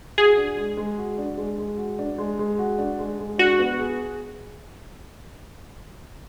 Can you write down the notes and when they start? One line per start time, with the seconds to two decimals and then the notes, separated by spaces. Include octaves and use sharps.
0.18 F#4 G#4
0.37 D4
0.57 G#3
0.77 G#3
0.98 F#4
1.18 D4
1.37 G#3
1.58 G#3
1.78 F#4
1.99 D4
2.18 G#3
2.39 G#3
2.59 F#4
2.78 D4
2.99 G#3
3.19 G#3
3.38 D4 F#4
3.59 B3
3.79 G#4